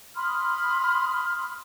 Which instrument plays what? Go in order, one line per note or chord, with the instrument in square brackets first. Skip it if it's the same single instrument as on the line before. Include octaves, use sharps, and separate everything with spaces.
[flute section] B5 C6 D#6 F6